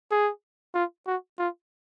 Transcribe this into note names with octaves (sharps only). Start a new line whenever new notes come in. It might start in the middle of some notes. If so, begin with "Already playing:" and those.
G#4
F4
F#4
F4